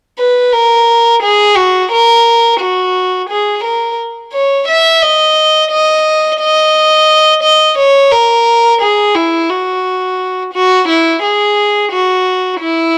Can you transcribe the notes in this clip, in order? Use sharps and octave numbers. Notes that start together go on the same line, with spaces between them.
B4
A#4
G#4
F#4
A#4
F#4
G#4
A#4
C#5
E5
D#5
D#5
D#5
D#5
C#5
A#4
G#4
E4
F#4
F#4
E4
G#4
F#4
E4